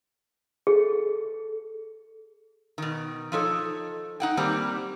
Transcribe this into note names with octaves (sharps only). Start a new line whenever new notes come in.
G#4 A4
B2 D#3
F3 D#4 A4 C#5
D#4 F#5 G5
D#3 G3 A#3 C4